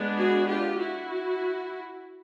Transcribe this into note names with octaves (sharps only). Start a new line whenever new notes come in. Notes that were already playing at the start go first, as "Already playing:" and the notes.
Already playing: G#3 B3 D4
F#4 G#4
F4 G4
E4 F#4